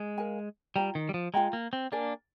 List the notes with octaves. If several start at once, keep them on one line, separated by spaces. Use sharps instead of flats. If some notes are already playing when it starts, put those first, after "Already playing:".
Already playing: G#3
A#4 F5 G#5
G3 F4 C5 G5 A#5
D#3
G3
F3
G#3 F4 C5 G5 A#5
A#3
C4
A#3 D4 A#4 D5 G#5